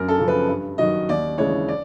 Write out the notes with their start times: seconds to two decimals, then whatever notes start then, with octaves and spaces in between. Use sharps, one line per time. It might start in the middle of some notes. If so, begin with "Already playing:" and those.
Already playing: F#2 A#4
0.09 A4
0.19 C#3 F3
0.28 B4
0.48 G2
0.78 D#3 F#3 D#5
1.09 D#2 D5
1.38 C#3 E3 G#3 C#5
1.68 D5